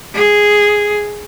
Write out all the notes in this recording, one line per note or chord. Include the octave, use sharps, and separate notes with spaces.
G#4